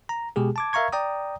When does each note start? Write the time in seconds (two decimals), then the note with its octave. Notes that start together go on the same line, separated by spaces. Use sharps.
0.09 A#5
0.36 B2 G#3 G4 G#4
0.56 A5 D6 G#6
0.73 A#4 E5 F5 A#5 C#6 G#6
0.92 D5 G5 A#5 D#6